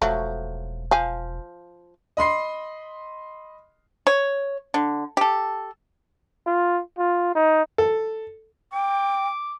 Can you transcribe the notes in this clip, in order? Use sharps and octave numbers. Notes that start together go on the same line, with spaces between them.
E1 F3 F#3 A3
F3 F5 G#5
D#5 B5 C6 C7
C#5
D3
G4 A4
F4
F4
D#4
A4
G5 D6